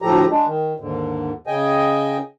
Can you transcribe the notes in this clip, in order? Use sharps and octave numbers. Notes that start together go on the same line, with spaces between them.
D2 A2 F3 A3 G4 A#5
G#3 D4
D#3
D#2 G#2 D3
C#3 D#5 G5 G#5